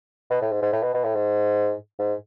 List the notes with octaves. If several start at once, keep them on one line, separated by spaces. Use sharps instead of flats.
B2
A2
G#2
G#2
A2
B2
B2
A2
G#2
G#2